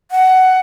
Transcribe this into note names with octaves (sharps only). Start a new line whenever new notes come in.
F#5